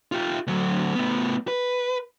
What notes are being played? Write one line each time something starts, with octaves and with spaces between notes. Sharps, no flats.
F4 G4
D2 F#3
A2 B3
B4